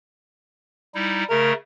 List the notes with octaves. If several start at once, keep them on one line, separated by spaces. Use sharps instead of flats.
G3 D#4 E4
C#3 A3 A#4